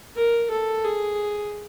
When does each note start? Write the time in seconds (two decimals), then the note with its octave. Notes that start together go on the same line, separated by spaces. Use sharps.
0.16 A#4
0.50 A4
0.84 G#4